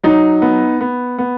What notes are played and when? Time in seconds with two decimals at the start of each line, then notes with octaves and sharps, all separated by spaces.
0.04 F#3 D#4
0.42 B3
0.81 B3
1.18 B3